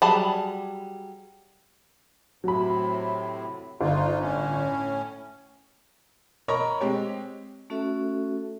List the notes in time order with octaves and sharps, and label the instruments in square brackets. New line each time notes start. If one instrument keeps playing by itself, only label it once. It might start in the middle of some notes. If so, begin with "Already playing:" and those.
[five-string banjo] F#3 G3 G#4 A5 B5
[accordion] A2 C3 [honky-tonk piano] F#3 B5
[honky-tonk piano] G1 [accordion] C4 D#4 F4
[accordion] A2 C#4
[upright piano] A#4 C#5 D#5 A#5 B5 C#6
G#3 C4 G4 C#5
[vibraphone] A3 C#4 F#4 A4 E5